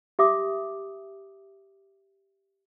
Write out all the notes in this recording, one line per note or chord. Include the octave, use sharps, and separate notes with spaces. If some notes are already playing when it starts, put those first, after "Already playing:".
G4 E5 D6 D#6